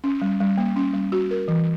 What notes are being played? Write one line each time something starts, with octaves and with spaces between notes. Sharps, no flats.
C#4
G3
G3
A#3
C#4
G3
F#4
A#4
E3